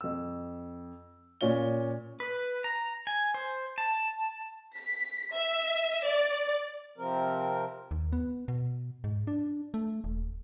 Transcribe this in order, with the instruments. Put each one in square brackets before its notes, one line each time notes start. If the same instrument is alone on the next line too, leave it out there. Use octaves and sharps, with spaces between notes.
[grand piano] F2 E6
A#2 C#4 F4 D5 G7
[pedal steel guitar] B4
A#5
G#5
C5
A5
[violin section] B6
E5
D5
[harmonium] C3 F3 C4 A#4
[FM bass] D#2
B3
B2
G#2
D4
A3
D#1